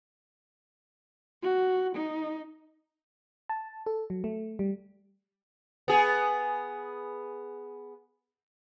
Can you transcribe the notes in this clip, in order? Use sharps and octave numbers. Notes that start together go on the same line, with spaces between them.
F#4
D#4
A5
A4
F#3
A3
G3
B3 G#4